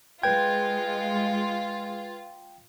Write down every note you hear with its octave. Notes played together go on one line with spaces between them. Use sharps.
G#3 F4 B4 G5 G#6